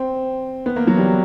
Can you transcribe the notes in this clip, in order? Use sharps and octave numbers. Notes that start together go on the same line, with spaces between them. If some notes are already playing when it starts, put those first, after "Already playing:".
Already playing: C4
B3
A#3
F#3
G3